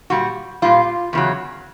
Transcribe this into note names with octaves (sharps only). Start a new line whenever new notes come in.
A#2 G3 F#4
A#2 G3 F4
E2 C#3 F#3